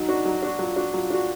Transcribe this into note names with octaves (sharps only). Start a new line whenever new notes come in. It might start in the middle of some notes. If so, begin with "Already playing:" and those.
Already playing: F#3 D#4
D4 F#4
F#3
D4 F#4
F#3 F4
D4 F#4
F#3 F4
D4 F#4